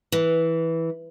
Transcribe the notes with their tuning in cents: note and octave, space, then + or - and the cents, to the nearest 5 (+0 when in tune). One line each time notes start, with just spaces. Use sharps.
E3 -10